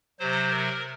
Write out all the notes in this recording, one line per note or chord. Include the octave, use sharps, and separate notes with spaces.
C3 F#3 C5
A#4